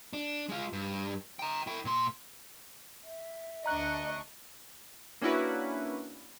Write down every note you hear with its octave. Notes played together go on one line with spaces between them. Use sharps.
D4
G#3 F4
G2
G5 A#5
E4 G5
A#2 C6
E5
D2 D4 D#5 A#5 C#6 F#6
A#3 C#4 D4 E4 F#4 B4